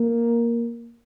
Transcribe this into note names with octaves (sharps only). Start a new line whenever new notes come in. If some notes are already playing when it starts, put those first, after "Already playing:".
Already playing: A#3